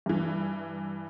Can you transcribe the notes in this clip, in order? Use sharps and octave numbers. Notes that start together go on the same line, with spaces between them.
G2 E3